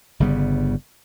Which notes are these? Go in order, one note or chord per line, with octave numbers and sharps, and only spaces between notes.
G1 C#3 G3 B3